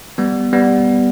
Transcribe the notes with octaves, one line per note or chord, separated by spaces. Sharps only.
G3 B3
G3 B3